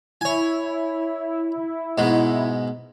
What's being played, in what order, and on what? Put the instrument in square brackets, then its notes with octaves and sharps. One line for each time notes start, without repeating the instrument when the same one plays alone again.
[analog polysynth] E4 [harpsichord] C#5 G#5
[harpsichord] G#2 B2 G#3